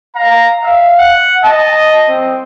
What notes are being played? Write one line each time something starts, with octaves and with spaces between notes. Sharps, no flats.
F5 A#5
E5 F5
F#5
D#5 A5
C4